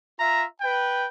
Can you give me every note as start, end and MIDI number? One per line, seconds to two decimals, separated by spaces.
0.19 0.45 65
0.19 0.45 76
0.19 0.45 82
0.61 1.08 71
0.61 1.08 79